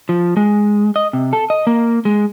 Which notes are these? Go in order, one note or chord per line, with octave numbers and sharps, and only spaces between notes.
F3
G#3
D#5
C3
A4
D#5
A#3
G#3